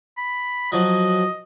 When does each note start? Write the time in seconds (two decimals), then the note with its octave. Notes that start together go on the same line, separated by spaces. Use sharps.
0.18 B5
0.72 F3 F#3 D#5